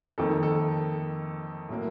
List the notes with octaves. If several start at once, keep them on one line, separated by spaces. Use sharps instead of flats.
F2 D#3 A#3 A4
A4
A2 F#3 A#3